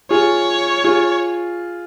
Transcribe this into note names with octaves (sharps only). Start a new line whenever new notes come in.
F4 G#4 C#5
F4 G#4